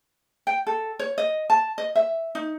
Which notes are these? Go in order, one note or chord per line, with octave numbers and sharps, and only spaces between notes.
G5
A4
C#5
D#5
A5
D#5
E5
D#4